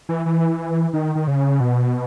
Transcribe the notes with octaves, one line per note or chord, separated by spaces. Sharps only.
E3
E3
D#3
D#3
C#3
B2